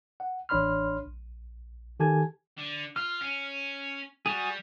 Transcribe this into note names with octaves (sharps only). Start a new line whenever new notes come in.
F#5
A1 D4 C#5 B5 C6 F6
A#1
D#3 G4 A4 G#5 A5 G#6
D3
F4 F6
C#4
G3 F#4 G#4